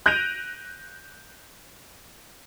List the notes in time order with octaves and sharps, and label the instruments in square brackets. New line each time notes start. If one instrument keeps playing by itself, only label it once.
[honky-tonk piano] F#6 G6 A#6 D7 D#7 F7